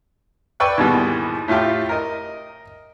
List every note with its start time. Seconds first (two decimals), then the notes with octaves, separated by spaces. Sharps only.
0.60 B4 D5 G5 C#6 E6 F#6
0.78 D#2 G#2 B2 E3 G3 G#3
1.48 A2 A3 F4 G4
1.89 A#4 D#5